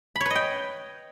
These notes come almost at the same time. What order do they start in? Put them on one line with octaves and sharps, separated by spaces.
B5 C#5 B4 D#5 G5